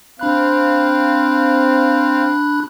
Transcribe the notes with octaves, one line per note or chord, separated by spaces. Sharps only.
C4 D4 F5 B5 F#6